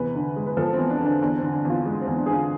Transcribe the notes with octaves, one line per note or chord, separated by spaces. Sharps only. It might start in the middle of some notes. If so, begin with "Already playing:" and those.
Already playing: E2 C3 B4
D3
G#3
B4
F3 A4
C4
E2
D4
D3 D4
E2 D4
D3 C4
D4
E2 F4
G#3
C4
E2
D4
G#4
D3 F4